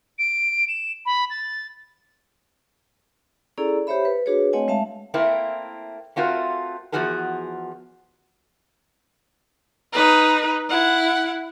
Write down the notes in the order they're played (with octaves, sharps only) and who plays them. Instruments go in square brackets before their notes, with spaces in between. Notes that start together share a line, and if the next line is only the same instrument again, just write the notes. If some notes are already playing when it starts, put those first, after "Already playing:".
[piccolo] D7
E7
B5
A6
[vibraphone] C#4 E4 G#4 A4 D5 A#5
G4 C5 C#5 E5 B5
B4
D4 F#4 G#4 B4 C#5
A3 C4 C#5 D#5 F#5 G#5
G#3 E5 F5 A5
[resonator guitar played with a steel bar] A3 A#3 C4 E4 A#4
A3 C4 F4 F#4 A#4
E2 B2 F3 F#4 G#4 A#4
[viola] D#4 B4
E4 F#5